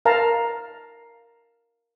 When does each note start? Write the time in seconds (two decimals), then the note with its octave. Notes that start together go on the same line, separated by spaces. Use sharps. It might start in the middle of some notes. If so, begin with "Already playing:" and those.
0.05 A#4 F5 A5 A#5